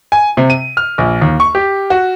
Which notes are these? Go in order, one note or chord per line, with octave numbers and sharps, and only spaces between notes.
G#5
C3
D#7
F6
A#1
D#2
C#6
G4
F#4